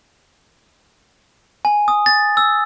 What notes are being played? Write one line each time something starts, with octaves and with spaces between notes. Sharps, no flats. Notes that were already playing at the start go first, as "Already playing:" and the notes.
G#5
D#6
A6
E6